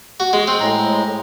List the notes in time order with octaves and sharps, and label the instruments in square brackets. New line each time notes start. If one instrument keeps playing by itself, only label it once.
[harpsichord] F#4
G#3
C4
[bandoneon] A2 G#3 A#5